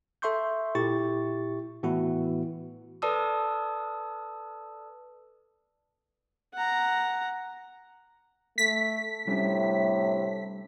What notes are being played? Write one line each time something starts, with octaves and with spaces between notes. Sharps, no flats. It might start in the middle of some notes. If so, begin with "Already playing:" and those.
A4 E5 C6 C#6 G6
A#2 E4 G4 C#6 A6
A2 E3 B3 E4 F#4
A4 B4 D5 A5 D#6 E6
F#5 A#5
A3 B6
A2 C3 G3 C#4 D4